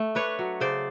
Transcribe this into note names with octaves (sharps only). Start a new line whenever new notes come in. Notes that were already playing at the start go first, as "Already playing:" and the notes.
Already playing: A3
D4 B4 C#5
F#3
C#3 C5 D5